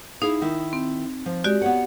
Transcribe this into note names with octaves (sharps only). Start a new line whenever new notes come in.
D#4 E4 G#4 F5
D#3 E4
C4
F3
G#3 F#4 G4 D5
B3 C#5 F#5